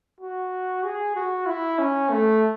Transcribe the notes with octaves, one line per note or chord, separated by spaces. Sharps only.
F#4
G#4
F#4
E4
C#4
A3